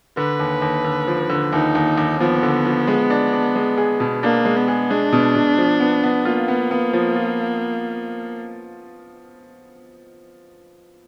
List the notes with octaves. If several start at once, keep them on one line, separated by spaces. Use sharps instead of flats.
D3 B4
D#2
D#2
D3
F3
D3
D#2 D#4
D#2
D#2
F3 B3
D3
F3
G#3
D4
D4
G#3
G#4
B2
A#3 D4
G#3
B3
G#4
G#3 D4
B2
B2
F3
B3
B3
A#3 F4
B3
B3
F3
F4